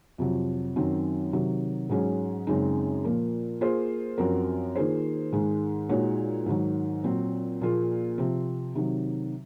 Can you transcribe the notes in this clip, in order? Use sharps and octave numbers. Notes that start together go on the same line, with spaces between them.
F2 C3 F#3
F#2 D#3 F#3 C4
C3 D#3 F#3
G#2 F#3 C#4 G#4
F#2 C#3 G#3 C4 D#4
A#2 F3 A#3
A#3 F4 G#4 C5
F#2 F3 C4 F#4 A#4
D#3 A#3 F4 G#4 C5
G#2 D#3 G#3
A#2 G#3 D#4 F#4 C#5
G#2 D#3 F#3
A#2 F#3 C4
A#2 F3 A#3 F4 G#4
C3 F3 C4
C3 D#3 F#3